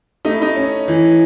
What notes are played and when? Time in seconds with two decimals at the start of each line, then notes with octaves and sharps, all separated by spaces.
0.25 A3 D#4
0.33 E4
0.42 D#4
0.56 C#4
0.88 E3